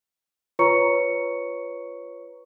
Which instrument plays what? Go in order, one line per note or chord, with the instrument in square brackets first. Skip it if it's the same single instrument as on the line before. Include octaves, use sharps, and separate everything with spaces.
[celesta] F4 B4 C#5 A#5 C#6 C#7